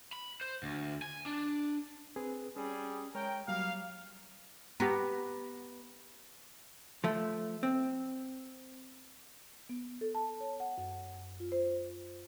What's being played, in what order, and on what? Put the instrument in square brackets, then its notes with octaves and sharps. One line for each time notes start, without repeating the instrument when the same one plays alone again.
[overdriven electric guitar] B5
C5
D2
G#5
D4
[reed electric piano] C4 G#4 B4
[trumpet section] G3 G#4 [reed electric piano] C#4
[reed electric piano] G#3 C#5 [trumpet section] A#4 G5
[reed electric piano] F#3 G3 [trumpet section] A#3 F5
[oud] B3 [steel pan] G4 A#5
[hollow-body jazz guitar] F3 A3
C4
[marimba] B3
A4
A5
C#5
F#5
F#2
F4
C5